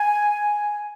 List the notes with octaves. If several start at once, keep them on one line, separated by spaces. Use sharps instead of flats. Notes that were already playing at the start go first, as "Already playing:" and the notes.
Already playing: G#5